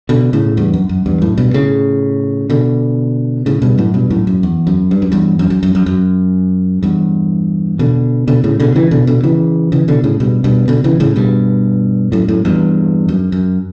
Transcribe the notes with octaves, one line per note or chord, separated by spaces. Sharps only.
B2 D3
A2 C#3
E2 G2
F#2
F#2
E2 G2
F#2 A2
G2 B2
A2 C#3
B2 D3
A2 C#3
G2 B2
F#2 A2
G2 B2
F#2 A2
F#2
E2
F#2
G2
F#2
E2 G2
F#2
F#2
F#2
F#2
F#2
E2 G2
B2 D3
B2 D3
A2 C#3
B2 D3
C#3 E3
B2 D3
B2 D3
C#3 E3
C#3 E3
B2 D3
A2 C#3
G2 B2
G2 B2
B2 D3
C#3 E3
A2 C#3
G2 B2
F#2 A2
F#2 A2
E2 G2
F#2
F#2